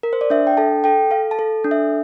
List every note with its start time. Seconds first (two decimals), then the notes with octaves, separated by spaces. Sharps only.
0.03 A#4
0.13 C5
0.21 D5
0.30 D4 E5
0.47 G5
0.57 A4 A5
0.84 A4 G5
1.11 A4 F5
1.31 A5
1.39 A4
1.64 D4
1.71 E5